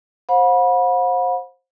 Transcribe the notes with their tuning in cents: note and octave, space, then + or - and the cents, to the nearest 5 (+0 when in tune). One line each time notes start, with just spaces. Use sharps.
C5 +20 F#5 -45 B5 -25